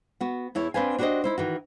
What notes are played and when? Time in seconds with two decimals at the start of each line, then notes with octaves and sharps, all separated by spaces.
0.21 B3 F#4
0.55 E2 E4 C#5
0.74 C4 D4 B4 C5 F5 G#5
0.99 D4 F#4 G4 B4 C5 D#5
1.24 D#4 E4 C5
1.38 D#3 E3 F#4